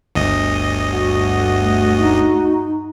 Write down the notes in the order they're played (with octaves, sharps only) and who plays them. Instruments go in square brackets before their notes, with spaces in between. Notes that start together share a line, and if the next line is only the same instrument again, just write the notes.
[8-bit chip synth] G1 D2 D#5
[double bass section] G2 A3 [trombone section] F#4
[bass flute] D#4